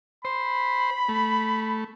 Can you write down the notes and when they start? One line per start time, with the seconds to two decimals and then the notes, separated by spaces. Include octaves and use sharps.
0.25 C5 B5
1.09 A3